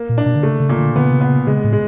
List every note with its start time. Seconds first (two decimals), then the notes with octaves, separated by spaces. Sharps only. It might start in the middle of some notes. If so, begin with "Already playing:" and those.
Already playing: A#3
0.09 A#2
0.18 D4
0.26 B2
0.36 D3
0.43 C#3 A3
0.60 C#3
0.69 A#2
0.78 D3
0.95 D3 B3
1.02 C#3
1.10 C3
1.17 C#3 B3
1.47 C#3 G#3
1.64 A2
1.72 G#3